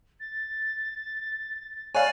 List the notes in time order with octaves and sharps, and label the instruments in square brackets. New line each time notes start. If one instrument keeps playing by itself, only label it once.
[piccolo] A6
[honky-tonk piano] C#5 F5 [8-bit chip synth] D5 G#5 [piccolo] F#6